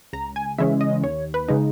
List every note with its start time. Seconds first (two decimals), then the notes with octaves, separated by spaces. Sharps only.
0.13 C#2 A#5
0.36 G#5
0.58 C#3 E3 G#3 C#4 E5
0.81 D#5
1.04 D#2 C#5
1.34 B4
1.48 C#3 G#3 D#4